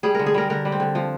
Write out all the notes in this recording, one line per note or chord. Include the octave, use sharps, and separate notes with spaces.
G3 G#4
D3 A#4
G#4
G3 A#4
D3 A#4
G3
C4
D3
F3